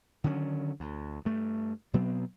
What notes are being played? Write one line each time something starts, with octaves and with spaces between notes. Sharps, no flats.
D3 D#3 F#3 C#4
D2
G2 A3
B2 F#3 B3 C4